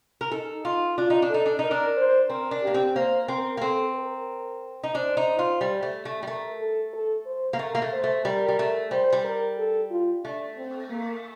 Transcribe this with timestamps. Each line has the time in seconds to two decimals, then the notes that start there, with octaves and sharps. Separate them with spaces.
0.21 A#4
0.31 D#4 A4
0.65 F4
0.97 D4 F4
1.10 D#4
1.22 D4
1.30 D#4 A4
1.46 D4
1.59 D#4
1.64 A#4
1.71 D4
1.97 C5
2.29 C4 A#4
2.51 D4
2.62 A#3 G4
2.74 C4
2.95 A#3 C5
3.28 C4 A#4
3.57 A#3
3.61 C4 A4
3.95 A#4
4.83 D#4
4.95 D4 C5
5.17 D#4
5.39 F4
5.61 G3
5.83 A3
6.05 A3
6.23 G3
6.27 A3 A#4
6.59 A4
6.93 A4
7.26 C5
7.53 A#3
7.59 A3 A#4
7.75 A#3
7.82 A3
7.93 C5
8.04 A3
8.25 G3 A#4
8.48 G3
8.59 A3
8.91 G3 C5
9.13 G3
9.24 A#4
9.58 A4
9.91 F4
10.24 A3 D4
10.57 C4
10.90 A#3